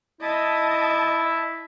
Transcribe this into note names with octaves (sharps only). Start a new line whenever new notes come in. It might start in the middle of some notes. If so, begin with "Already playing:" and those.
E4 D#5 A5